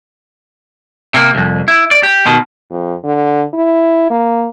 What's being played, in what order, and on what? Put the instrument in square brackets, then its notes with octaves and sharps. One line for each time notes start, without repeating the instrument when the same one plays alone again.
[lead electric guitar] C3 A#3
C2 F2
E4
D5
G4
B2 D#3
[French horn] F2
D3
E4
A#3